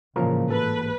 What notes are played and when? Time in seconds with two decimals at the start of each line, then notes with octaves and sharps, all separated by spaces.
0.16 A1 G#2 C#3 E3 F3 A#3 G#4 A#4
0.50 A4 B4